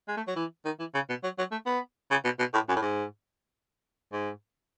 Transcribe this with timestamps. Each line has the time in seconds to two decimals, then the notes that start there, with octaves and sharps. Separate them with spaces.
0.08 G#3
0.17 A3
0.27 F#3
0.36 E3
0.65 D#3
0.80 E3
0.94 C#3
1.09 B2
1.23 F#3
1.38 F#3
1.52 A3
1.66 B3
2.11 C#3
2.24 B2
2.39 B2
2.54 A2
2.69 F#2
2.76 A2
2.82 G#2
4.12 G#2